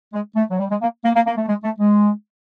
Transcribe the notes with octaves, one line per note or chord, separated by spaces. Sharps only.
G#3
A3
F#3
G3
G#3
A#3
A#3
A#3
A#3
A3
G#3
A3
G#3